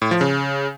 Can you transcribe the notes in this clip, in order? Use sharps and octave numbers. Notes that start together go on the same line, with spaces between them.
A2
F3
C#3